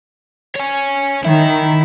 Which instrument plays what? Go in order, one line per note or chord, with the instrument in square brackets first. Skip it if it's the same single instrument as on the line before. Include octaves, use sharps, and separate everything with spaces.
[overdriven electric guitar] C#5 G#5
[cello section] D#3 [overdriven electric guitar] E4